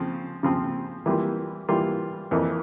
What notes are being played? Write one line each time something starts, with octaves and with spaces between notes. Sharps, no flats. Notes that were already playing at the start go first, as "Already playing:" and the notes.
Already playing: C#3 F3 C4
C#3 F3 C4
E3 G3 A#3 F4
E3 G3 A#3 F4
F2 E3 A#3